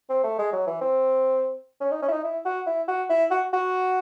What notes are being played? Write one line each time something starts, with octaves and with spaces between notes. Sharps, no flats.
C4
A3
G#3
F#3
E3
C4
C#4
D#4
C#4
E4
D#4
E4
F#4
E4
F#4
E4
F#4
F#4